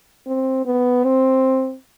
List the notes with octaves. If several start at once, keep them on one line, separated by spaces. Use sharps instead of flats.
C4
B3
C4